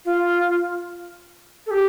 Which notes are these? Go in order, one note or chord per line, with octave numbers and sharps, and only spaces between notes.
F4
A4
G4